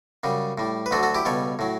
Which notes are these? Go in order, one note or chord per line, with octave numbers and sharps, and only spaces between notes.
F#2 C#3 G3
A2 G3
B4
D2 D3 F#3 F#4 A4
F#4 A4
E4 G4
C#2 B2 G3 A4 C#5
A2 F#3